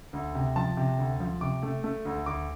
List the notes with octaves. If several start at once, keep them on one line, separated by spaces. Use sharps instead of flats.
D2
C3
F3 A5
C3
D2
F3
C3 D6
A3
A3
D2
D2 D6